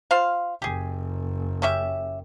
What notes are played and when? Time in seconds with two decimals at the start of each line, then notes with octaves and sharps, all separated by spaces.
0.11 F4 C5 F5
0.62 F#1 G4 G#4
1.62 C#4 G4 E5